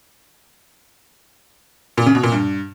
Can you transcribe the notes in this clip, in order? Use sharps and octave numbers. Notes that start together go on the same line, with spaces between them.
A#2
C#3
B2
A#2
G2